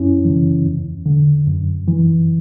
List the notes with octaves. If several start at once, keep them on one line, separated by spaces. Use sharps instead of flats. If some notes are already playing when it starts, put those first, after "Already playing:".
Already playing: F#2 C#4 E4
C#3 E3
E2
D3
F#2
E3